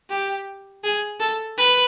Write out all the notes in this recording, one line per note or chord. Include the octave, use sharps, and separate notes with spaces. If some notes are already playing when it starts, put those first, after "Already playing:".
G4
G#4
A4
B4